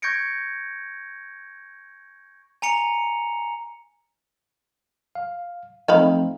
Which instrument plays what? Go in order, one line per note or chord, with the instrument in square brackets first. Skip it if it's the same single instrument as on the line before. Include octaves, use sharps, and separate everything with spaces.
[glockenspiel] C#6 G6 G#6 A#6 C#7 D7
G#5 A#5 C#7 F7
[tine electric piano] F5
[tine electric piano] F3 A3 C4 [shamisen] D#4 F5 B5